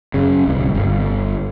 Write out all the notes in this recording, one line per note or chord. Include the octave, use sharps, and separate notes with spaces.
F#2 C#3
D1 C2
G1